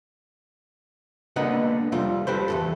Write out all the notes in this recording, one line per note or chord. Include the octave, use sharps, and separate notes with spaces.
D3 A#3 B3 B4 D#5 F#5
F2 C3 G3 F4
G4 A4 B4 C5
E2 G#2 A4